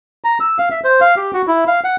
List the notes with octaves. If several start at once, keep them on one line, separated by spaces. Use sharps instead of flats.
A#5
E6
F5
E5
C5
F5
G4
F#4
E4
F5
F#5